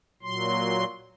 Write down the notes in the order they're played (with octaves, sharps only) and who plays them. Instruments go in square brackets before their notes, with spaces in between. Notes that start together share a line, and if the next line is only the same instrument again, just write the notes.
[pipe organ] A#2 F#3 C6